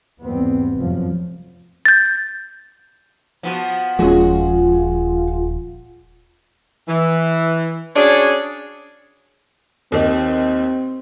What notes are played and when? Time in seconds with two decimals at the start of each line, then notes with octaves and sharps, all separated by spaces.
0.22 E2 G#2 G3 B3 C4
0.77 F1 F#2 F3
1.85 G6 A6
3.43 F3 B3 F#4
3.99 D#1 F3 G#3 C#4 F4 F#4 G#4
6.88 E3
7.96 C#4 D4 F#4 G#4 C#5 D5
9.92 D#2 D#3 C4